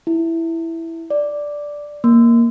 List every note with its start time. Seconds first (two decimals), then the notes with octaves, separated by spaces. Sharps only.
0.07 E4
1.10 D5
2.04 A#3